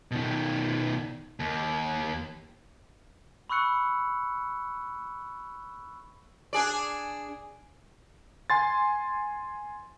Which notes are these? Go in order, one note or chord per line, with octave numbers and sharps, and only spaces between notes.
B2 D#3
D#2
B5 C#6 E6 F#6 C#7
D4 G#4 D5
G#5 C6 A6